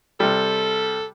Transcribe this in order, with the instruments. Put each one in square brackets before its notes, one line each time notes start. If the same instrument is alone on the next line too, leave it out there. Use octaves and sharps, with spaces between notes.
[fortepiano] C3 G3 [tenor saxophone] A4